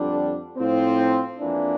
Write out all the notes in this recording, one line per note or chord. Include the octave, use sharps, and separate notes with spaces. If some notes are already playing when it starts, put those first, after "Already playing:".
Already playing: F2 D3 G3 D4
A2 F3 C4
F2 E3 A#3 D4